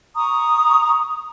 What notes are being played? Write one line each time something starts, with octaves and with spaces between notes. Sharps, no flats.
A#5 C#6 D#6